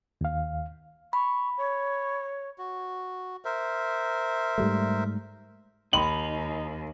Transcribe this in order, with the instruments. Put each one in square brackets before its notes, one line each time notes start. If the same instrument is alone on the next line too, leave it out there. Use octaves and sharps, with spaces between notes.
[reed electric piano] D#2 F5
[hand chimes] B5 [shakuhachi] C#6
[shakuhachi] C#5
[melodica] F#4
A#4 C5 E5
[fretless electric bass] G#2 G3 A3
[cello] D#2 [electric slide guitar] D#4 [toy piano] G5 B5 C6 [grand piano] F#7